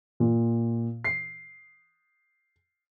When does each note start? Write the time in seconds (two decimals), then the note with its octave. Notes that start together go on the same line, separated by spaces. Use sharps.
0.20 A#2
1.04 C7